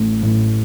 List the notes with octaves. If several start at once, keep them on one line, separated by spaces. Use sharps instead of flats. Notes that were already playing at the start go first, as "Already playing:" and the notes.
Already playing: A1 A2
A2